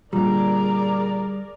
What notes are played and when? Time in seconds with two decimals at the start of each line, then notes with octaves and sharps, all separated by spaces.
0.13 A#2 D3 G3 G#4 A#4 D5 A#5